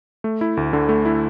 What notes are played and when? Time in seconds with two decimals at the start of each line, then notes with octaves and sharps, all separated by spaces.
0.24 A3
0.41 E4
0.57 D2
0.73 D3
0.89 A3
1.05 E4